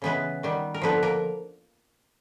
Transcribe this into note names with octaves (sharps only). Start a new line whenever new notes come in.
C#3 E3 G#3 B3 B4
D#3 G3 B3
A#4
D3 F3 A#3 B3 B4
A#3 A#4